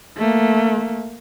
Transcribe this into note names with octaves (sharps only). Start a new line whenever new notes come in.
A3 A#3